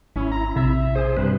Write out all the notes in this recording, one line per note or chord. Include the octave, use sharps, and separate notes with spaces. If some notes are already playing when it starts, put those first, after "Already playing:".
G#1 C#4 E4
A#5
A#1 C3 E5
G#4 C5
G2 C3 B4